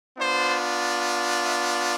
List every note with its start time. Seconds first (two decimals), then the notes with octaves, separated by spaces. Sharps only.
0.18 B3 D4 F4 C5
1.44 E5